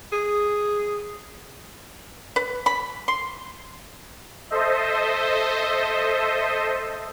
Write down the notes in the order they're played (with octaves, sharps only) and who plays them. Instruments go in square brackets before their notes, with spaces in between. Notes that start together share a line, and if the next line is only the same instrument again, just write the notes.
[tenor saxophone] G#4
[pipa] B4
B5
C6
[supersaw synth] A4 C5 D#5 E5